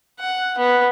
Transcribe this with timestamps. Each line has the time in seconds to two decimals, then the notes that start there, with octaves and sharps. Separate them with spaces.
0.19 F#5
0.58 B3